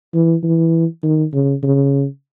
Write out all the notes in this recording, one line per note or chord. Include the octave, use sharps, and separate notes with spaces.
E3
E3
D#3
C#3
C#3